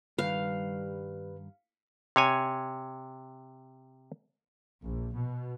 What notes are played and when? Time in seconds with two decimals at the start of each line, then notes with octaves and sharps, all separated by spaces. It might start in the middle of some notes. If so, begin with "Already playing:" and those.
0.18 G2 D#3 G3 B4 F5
2.16 C3 C#5 G#5
4.84 A#1
5.15 B2